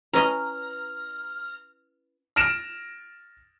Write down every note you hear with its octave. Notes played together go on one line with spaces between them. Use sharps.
C#4 E4 B4 D#5 A#5 F6
F6 A#6 D7 E7